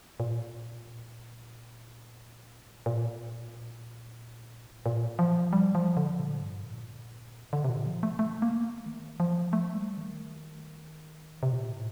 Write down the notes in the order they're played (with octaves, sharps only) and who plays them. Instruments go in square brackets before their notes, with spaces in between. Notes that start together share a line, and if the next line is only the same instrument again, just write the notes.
[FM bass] A#2
A#2
A#2
F3
G3
F3
D3
A#2
G2
A#2
D3
C3
A#2
F3
A3
A3
A#3
A3
D#3
F3
A3
G3
D#3
C3
A#2
A2